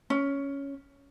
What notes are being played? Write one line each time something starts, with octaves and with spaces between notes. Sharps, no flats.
C#4